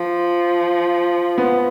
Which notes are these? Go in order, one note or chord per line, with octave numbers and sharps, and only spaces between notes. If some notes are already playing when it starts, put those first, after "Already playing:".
Already playing: F3
B3